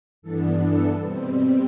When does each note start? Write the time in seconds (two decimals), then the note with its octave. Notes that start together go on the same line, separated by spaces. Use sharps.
0.22 G2 E3 B3 D4 A4
0.62 A4
1.02 B2 G3 C4